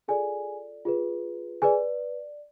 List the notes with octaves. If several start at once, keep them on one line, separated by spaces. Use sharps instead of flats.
F4 G#4 A4 D5 G#5
F4 G#4 B4
G#4 B4 D5 G#5